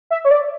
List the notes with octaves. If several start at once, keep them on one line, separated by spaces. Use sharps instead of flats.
E5
C#5
D5